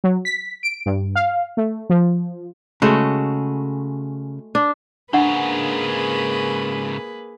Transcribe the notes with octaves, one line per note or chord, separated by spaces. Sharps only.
F#3
B6
D7
G2
F5
A3
F3
C#3 G#3 A3 F#4
D4
G#2 C#3 A#3 D4 G#4 B4 F#5